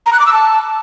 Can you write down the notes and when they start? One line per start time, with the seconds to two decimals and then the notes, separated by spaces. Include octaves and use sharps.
0.06 A#5
0.13 F#6
0.19 D6
0.26 E6
0.33 A5